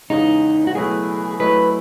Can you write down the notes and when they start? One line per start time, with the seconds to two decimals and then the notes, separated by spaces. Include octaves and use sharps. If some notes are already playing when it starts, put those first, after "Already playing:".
0.10 E2 C#3 G#3 D#4
0.67 F#4
0.75 B2 F#3 A3 E4 G#4 B4
1.40 F#3 A3 E4 G#4 B4 D#5